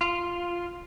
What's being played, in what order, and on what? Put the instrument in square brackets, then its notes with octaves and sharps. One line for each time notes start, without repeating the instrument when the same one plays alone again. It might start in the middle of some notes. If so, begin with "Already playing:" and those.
[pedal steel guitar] F4